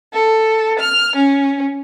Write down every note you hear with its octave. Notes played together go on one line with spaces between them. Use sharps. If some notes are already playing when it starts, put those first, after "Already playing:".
A4
F6
C#4